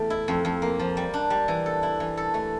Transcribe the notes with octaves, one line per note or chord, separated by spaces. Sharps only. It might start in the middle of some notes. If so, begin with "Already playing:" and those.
Already playing: E2 A3 G4
E4
F2
F2
A#3
F3
G3
D4
G3
E3
A4
E4
E3
A4
A3